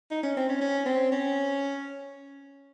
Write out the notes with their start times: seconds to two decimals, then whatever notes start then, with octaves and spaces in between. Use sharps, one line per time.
0.11 D#4
0.23 C#4
0.37 C4
0.49 C#4
0.61 C#4
0.86 C4
1.12 C#4